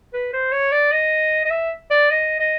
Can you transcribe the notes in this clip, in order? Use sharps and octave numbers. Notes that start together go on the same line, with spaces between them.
B4
C5
C#5
D5
D#5
D#5
E5
D5
D#5
D#5